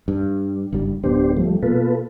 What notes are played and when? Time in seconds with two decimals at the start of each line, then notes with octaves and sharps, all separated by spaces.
0.08 G2
0.73 F#1 G2 G3
1.03 D1 B3 D4 G4 C5
1.37 F3 G3 A3
1.63 B2 A#3 F4 A4 B4